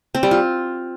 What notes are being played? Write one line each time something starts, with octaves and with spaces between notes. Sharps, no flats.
C4
G3
F4